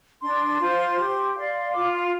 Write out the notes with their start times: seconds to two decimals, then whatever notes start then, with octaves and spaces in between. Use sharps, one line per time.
0.21 D4 C6
0.59 F4 C5
0.98 G4
1.36 D5 F5 C6
1.74 F4 D6
1.94 C6